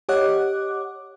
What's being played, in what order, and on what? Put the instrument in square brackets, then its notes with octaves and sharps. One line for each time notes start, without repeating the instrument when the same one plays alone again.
[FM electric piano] G4 C#5 D#5 F#5 D6 F#6